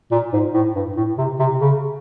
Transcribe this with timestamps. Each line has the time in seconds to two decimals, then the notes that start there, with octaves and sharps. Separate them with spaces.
0.11 A#2
0.33 G#2
0.54 A2
0.75 G2
0.97 A2
1.18 C3
1.39 C3
1.61 C#3